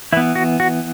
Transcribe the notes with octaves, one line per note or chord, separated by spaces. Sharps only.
E3 B3 E4
F#4
F#4